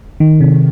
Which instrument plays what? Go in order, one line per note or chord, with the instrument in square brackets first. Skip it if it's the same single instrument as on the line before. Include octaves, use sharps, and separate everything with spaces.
[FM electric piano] D#3
C3